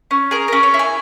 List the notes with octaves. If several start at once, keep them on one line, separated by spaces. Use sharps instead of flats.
C#4
G#4 A#4
C#4 A#4
C#5
E4
G#5